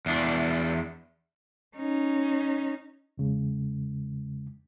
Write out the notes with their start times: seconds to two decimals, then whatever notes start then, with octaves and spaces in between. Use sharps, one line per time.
0.06 E2 D4
1.76 C#4 D#4
3.18 E2 C#3 G#3